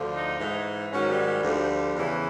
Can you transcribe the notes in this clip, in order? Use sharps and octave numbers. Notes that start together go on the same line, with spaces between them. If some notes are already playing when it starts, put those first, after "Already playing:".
Already playing: D2 D3 F3
D#4
G#2 E3
G#2 D#3 F#3 C#4
G3
G3
D2 D3 F3
E2 C#3 E3